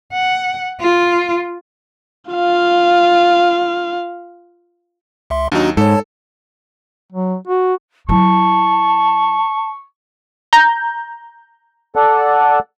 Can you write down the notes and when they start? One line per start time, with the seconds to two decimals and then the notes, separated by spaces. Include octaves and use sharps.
0.13 F#5
0.81 F4
2.31 F4 F5
5.30 C#2 E5 C6
5.52 D#2 F#3 D4 D#4 F#4
5.77 G#2 A4 C#5 A5
7.12 F#3
7.47 F#4
8.09 F#3 E4 A5 C#6
10.53 A#5 G6
11.96 A4 D5 F#5